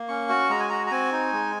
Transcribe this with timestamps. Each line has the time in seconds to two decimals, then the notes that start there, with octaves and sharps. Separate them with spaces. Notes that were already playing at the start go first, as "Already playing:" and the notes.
Already playing: A#3
0.08 C#4 C#6
0.29 F#4
0.50 G#3 A#5
0.60 G#5
0.69 F#4 A#5
0.87 A#5
0.91 C4 G#5
1.12 D#4
1.32 G#3